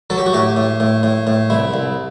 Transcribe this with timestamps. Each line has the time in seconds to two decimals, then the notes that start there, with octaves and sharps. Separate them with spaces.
0.10 F#3 A4
0.18 G4
0.26 F#4
0.33 A2 G4
0.57 A2
0.80 A2
1.03 A2
1.27 A2
1.50 C2 E4
1.74 C2